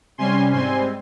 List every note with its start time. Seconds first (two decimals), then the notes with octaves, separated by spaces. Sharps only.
0.18 C3 G3 C#4 G#5 C6
0.53 G#2 G3 C4 G#5 C6